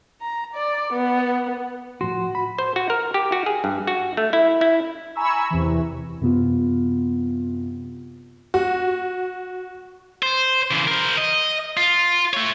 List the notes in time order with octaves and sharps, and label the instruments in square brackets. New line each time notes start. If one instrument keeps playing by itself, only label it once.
[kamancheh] A#5
D5
B3
[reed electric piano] A2 F3 C6 [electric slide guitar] F#4
[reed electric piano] B5
[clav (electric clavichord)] C5
F#4
A#4
G4
F#4
G#4
G2
F#4
A3
E4
E4
[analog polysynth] G#5 A#5 B5 C#6 E6
E2 C3 E3
[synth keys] F#2 C3 B3 F4
[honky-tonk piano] F#4
[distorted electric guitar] C5
C#3 E3
A#4 C5
D#5
F4
A3 C#5